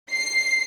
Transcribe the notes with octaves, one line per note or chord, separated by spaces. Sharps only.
C7